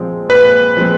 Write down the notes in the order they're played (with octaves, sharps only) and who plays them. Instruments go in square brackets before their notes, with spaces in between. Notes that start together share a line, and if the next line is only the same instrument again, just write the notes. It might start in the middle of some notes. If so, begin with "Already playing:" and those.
Already playing: [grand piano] A#2 F3 G#3 C4
[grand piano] A#2 [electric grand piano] B4
[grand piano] F3 G#3 C4